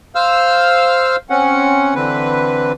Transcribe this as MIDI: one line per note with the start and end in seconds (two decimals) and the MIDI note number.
0.15 1.16 72
0.15 1.16 77
0.15 1.16 88
0.15 1.16 89
1.30 1.94 60
1.30 1.94 61
1.30 1.94 78
1.95 2.72 50
1.95 2.72 52
1.95 2.72 60
1.95 2.72 71